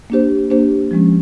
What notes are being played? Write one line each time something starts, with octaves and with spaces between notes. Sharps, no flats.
A#3 D4 G4 C5
A#3 D4 G4 C5
F3 G#3 C#4